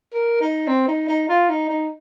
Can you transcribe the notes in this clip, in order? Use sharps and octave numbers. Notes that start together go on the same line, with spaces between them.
A#4
D#4
C4
D#4
D#4
F4
D#4
D#4